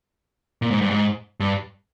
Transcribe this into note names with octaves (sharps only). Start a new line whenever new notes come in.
A#2
G#2
G2
G#2
G2